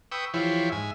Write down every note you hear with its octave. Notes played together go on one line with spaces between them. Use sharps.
B4 G5 C#6 D#6 E6
E3 F3 E4 G4 C5 C#5
G#2 E5 G#5